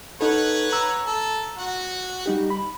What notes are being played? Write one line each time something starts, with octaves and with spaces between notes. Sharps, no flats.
D#4 A4 B4 C#5 F#5
A#5 E6
A4
F#4 F#5
G3 D#4 G4
B5